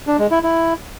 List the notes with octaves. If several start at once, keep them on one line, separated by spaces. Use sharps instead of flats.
D4
G#3
E4
E4